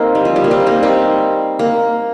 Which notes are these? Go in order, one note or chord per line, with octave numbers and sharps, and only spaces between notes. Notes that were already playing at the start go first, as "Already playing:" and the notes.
Already playing: A#3 C4 D#4
G3
F3
G3
A#3
G3 C4
A#3 D#4
G3 C4
A#3